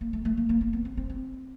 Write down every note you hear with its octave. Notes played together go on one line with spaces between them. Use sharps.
A#3
A3
A3
A#3
A#3
A#3
B3
C4
C4
C4